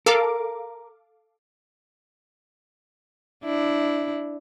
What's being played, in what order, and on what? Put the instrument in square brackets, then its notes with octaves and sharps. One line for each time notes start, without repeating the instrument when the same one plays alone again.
[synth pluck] A4 F5 D6 [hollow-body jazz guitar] A#4
[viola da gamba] D4 E4